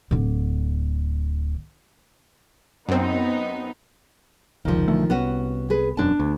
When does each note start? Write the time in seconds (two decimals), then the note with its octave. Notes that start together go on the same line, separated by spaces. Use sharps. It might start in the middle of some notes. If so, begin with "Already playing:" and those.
0.11 D1 D3
2.89 F#2 B3 C4 D#4
4.65 F1 C#2 D#3 F3
4.88 B1 D3 A3
5.10 C2 B3 C#4 F#4
5.70 G#4 B4
5.97 E1 F#2 D4 A5
6.20 D2